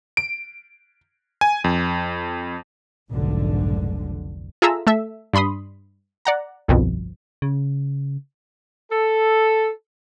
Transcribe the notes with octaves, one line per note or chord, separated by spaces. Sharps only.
D7
G#5
F2
F1 B1 G#2 D3
F4 G#4 A4 E5 A#5 E6
A3 A4 E5
G2 D4 B5 C6 D#6
D5 F#5 A#5
G1 C2 F2 B2
C#3
A4